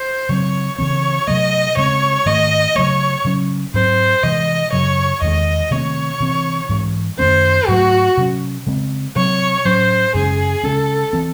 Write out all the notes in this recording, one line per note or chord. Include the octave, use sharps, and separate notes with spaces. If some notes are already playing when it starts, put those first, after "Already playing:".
Already playing: C5
C#3 F#3 C4 C#5
C#3 E3 C4 C#5
C3 F#3 A3 D#5
C#3 G#3 C4 C#5
G#2 D#3 A3 D#5
C#3 F#3 A3 C#5
C#3 F#3 C#4
G#2 F#3 C4 C5
C3 E3 G#3 D#5
F#2 C#3 F#3 C#5
E2 D#3 G#3 D#5
C3 D#3 A3 C4 C#5
C3 E3 C4
G#2 E3 G#3
F#2 D#3 A3 C#4 C5
G#2 F#3 A3 F#4
C3 F#3 C#4
C#3 G#3 C4
C3 F#3 C4 C#5
A2 F#3 C#4 C5
F#2 C#3 G#3 C#4 G#4
C#3 G#3 C#4 A4
E3 C4